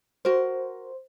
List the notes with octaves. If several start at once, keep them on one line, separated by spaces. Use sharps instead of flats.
F#4 A#4 C5